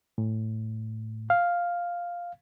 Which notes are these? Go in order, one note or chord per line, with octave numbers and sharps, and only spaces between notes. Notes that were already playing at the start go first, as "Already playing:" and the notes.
A2
F5